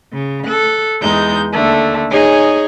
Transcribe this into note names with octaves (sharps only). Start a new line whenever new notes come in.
C#3
A4 F#6
E2 G#3 D#4 G6
D#2 D3 A3
D#4 G#4 C#5 G#5